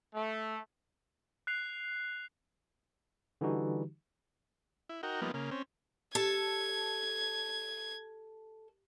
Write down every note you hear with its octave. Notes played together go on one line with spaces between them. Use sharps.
A3
F#6 C7 F7
D3 E3 G3 D#4 F#4 G4
E4
D#4 F#4 A#4 G5
F3 G3 A#3 B3 D#4
C#3 A#3
C4 C#4
G4 A4 A5 G#6